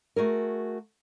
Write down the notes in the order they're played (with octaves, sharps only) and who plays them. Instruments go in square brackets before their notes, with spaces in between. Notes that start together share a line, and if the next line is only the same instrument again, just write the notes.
[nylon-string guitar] A3 F#4 G#4 A#4